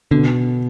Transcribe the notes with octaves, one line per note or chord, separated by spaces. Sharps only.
B2 D3